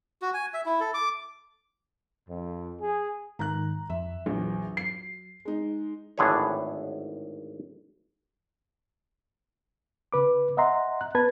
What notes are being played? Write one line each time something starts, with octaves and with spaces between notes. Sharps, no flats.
F#4
G#5
E5
E4
A4
D6
F2
G#4
G#2 D#3 A#5 F#6
F2 E5
A#1 E2 F#3
C7
G#3 D#4
G#1 A2 D3 G#4 B4 C#5
C#3 B4 D6
D#5 E5 F#5 A#5 C6
F#6
B3 B4 A5 G#6